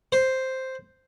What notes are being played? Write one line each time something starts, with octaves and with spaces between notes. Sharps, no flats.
C5